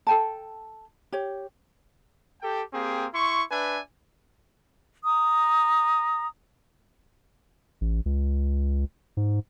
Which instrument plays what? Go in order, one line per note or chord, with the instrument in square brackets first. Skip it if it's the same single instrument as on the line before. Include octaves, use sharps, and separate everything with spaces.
[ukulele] A4 G5 A5
G4 C#5
[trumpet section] G4 A4 G5
A#3 C4 G4 G#4
E4 C6 C#6
D4 B4 E5 G#5
[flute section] A#5 D#6
[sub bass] A1
C#2
G#2